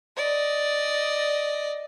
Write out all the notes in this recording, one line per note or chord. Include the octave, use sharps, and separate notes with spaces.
D5 D#5